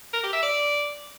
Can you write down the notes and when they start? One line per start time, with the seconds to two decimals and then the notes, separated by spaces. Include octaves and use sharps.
0.14 A#4
0.23 G4
0.33 E5
0.43 D5